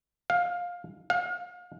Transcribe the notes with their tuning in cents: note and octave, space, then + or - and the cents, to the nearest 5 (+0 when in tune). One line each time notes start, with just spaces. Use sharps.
F5 +15
F5 +35